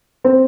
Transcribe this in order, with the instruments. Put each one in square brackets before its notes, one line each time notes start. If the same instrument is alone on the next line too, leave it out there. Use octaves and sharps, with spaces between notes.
[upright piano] C4